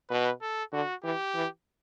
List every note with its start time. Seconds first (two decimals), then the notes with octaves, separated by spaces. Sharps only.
0.10 B2 B4
0.42 A4
0.73 D3 F#4
1.03 E3 G4
1.35 E3